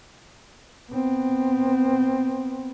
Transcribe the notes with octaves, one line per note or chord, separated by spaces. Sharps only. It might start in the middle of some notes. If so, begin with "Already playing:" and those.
B3 C4